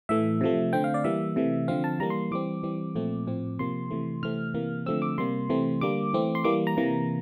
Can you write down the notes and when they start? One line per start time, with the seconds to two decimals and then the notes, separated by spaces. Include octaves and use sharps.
0.09 A2 E3 A3 E5
0.41 C3 F3 A3
0.73 D3 A3 C4 G5
0.84 F5
0.94 D5
1.04 E3 G3 A#3 E5
1.36 C3 E3 A3
1.68 D3 F3 C4 F5
1.84 A5
2.00 E3 G3 A#3 A#5
2.10 C6
2.31 E3 G3 C4 D6
2.63 E3 G3 C4
2.95 A#2 F3 A3 C4
3.27 A2 F3 C4
3.59 C3 F3 A#3 C6
3.91 C3 E3 A3
4.23 C3 E3 A3 C4 F6
4.54 C3 E3 A#3
4.86 D3 F3 A3 C4 E6
5.02 D6
5.18 C3 G3 A#3 C6
5.49 C3 E3 A3 C4
5.81 D3 G3 A#3 D6
6.14 E3 A3 C4
6.35 C6
6.44 E3 G3 A#3 D6
6.67 A#5
6.77 C3 E3 A#3